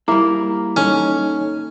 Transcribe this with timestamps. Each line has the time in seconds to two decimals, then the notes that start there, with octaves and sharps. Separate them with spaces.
0.08 G3 A#3 E4 A#5
0.77 C#4 D#4 A4 C#5